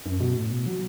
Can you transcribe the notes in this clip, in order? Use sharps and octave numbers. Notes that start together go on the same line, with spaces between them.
F#2
B2
A2
B2
F#3